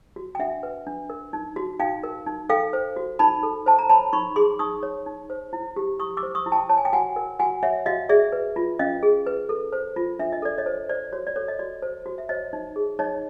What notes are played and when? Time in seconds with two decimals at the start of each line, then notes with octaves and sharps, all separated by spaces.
0.16 F#4
0.35 G5
0.39 D4 E5 F#5
0.63 B4
0.87 D4
1.10 A#4
1.33 D#4
1.56 F#4
1.79 D#4 F5 G5
2.03 A#4
2.26 D#4
2.49 A4 F5 G5
2.73 C5
2.96 F#4
3.19 D#4 A5 B5
3.43 A4
3.66 C5 A5
3.79 A#5
3.89 C#5 A5 B5
4.13 D#4 B5 C#6
4.36 G#4 C6 D6
4.59 D#4 C#6 D#6
4.83 C#5
5.06 D#4
5.30 C5
5.53 E4
5.76 G4
6.00 E4 C#6 D#6
6.17 D6 E6
6.23 C5
6.35 C#6 D#6
6.46 E4
6.52 G5 A5
6.69 C#5 A5
6.77 G#5
6.85 G5
6.93 F#4 F#5 G#5
7.16 A#4
7.39 F#4 F#5 G#5
7.63 C#5 E5 F#5
7.86 F#4 D#5 F5
8.09 G#4 D5 E5
8.32 B4
8.56 F4
8.79 C#4 D#5 F5
9.03 G#4
9.26 B4
9.49 A4
9.73 C5
9.96 F4
10.19 D4 E5
10.33 D#5
10.42 A4 D5
10.58 C#5 D#5
10.66 C5
10.89 C5 D5
11.13 F#4 C#5
11.27 D5
11.36 A4 C#5
11.48 D#5
11.59 F#4 D5
11.82 C5
12.06 F#4
12.18 E5
12.29 C5 C#5 D#5
12.53 D#4
12.76 G#4
12.99 D#4 C#5 D#5